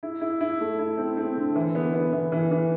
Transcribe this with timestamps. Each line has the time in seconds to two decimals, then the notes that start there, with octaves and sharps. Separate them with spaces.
0.03 E4
0.21 E4
0.41 E4
0.60 A3
0.79 E4
0.98 C4
1.17 C4
1.37 D3
1.55 E3
1.75 B3
1.94 B3
2.12 E3
2.32 E3
2.51 E3